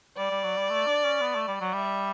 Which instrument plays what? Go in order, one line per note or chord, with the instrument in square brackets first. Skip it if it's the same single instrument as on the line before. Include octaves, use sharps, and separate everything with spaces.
[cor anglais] G3 [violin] D5
[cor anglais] G3
F#3
G3
A3
D4
C#4
B3
A3
G3
F#3
[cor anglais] G3 [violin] E5